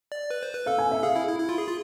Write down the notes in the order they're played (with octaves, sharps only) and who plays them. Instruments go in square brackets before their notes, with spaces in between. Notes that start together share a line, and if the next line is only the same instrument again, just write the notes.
[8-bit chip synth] D5
B4
C5
B4
[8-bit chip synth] A4 [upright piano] F5
[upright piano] G#5
E5
[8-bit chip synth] G#4 [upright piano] F5
[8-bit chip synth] E4
E4
E4
F4
G#4
F4